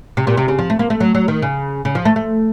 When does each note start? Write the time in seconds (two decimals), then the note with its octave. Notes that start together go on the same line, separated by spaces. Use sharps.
0.17 C3
0.27 A#2
0.37 C3
0.48 C#3
0.59 F3
0.70 A3
0.79 A#3
0.90 A3
1.00 F#3
1.14 F#3
1.28 D#3
1.42 C#3
1.85 C#3
1.95 F3
2.05 A3
2.16 A3